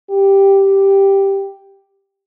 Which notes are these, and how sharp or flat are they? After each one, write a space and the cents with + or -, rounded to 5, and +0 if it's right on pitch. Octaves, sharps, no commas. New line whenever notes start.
G4 +0